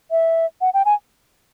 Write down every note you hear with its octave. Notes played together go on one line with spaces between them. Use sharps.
E5
F#5
G5
G#5